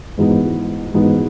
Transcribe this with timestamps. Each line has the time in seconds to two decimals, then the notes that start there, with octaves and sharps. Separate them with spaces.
0.18 G#2 E3 G#3 B3 D#4
0.94 G#2 E3 G#3 B3 D#4